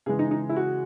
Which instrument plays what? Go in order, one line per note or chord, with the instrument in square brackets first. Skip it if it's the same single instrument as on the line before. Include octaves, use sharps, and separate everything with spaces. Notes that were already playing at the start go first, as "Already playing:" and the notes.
[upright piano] C#3 E3 G#3 G#4
D#4
D#4
E4
F#4